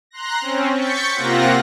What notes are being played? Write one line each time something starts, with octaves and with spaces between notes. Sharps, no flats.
A#5 C6 F#6 A#6
C4 C#4
C#6 G6 A6 B6 C#7
C3 A#3 C4 F4 F#5 A#6